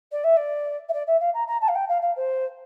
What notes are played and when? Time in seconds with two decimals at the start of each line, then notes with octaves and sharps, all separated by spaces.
0.11 D5
0.24 E5
0.36 D5
0.88 E5
0.93 D5
1.07 E5
1.20 F5
1.34 A#5
1.47 A#5
1.61 A5
1.68 F5
1.75 G5
1.88 F5
2.02 F5
2.16 C5